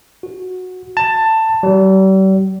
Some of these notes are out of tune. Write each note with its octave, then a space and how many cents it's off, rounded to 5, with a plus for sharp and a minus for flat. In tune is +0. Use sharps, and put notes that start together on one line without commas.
F#4 -10
A5 +15
G3 -40